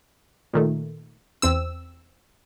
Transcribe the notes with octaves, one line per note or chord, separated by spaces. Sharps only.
A#2 D#3 A3
E2 C4 E6